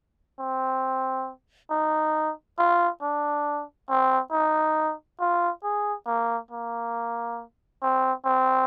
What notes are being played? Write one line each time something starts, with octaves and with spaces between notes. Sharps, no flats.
C4
D#4
F4
D4
C4
D#4
F4
G#4
A#3
A#3
C4
C4